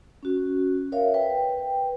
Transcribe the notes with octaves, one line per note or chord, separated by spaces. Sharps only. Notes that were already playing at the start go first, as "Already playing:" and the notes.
C#4 F#4
A#4 C#5 E5 F5
B4 G5